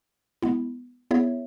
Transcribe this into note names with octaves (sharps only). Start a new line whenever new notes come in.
G#3 B3 E4
B3 E4 G#4 C#5 E5